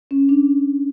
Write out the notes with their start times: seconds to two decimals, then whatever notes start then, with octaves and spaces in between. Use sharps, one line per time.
0.11 C#4
0.29 D4